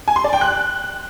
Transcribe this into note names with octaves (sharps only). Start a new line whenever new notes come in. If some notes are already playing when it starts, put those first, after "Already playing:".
G#5
C6
D5
G5
F#6